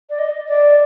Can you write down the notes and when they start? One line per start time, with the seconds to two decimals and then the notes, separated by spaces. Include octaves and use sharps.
0.10 D5
0.19 D#5
0.48 D5